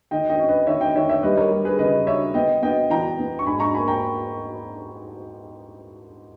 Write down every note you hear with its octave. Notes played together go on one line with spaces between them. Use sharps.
D#3 D#5 G5
D#5 G5
C#4
B4 D#5
D#3 C#5 E5
D#5 G5
D#3 C#5 E5
C#5 E5
G3 B4 D#5
A#4 C#5
G3
G#4 B4
C#3 B4 D#5
C#4 C#5 E5
B3 D#5 G5
B3 D#5 G5
E3 G5 A#5
B3
C#6
G#2 G#5 B5
A#5 C#6
A#3 G#5 B5
G5 A#5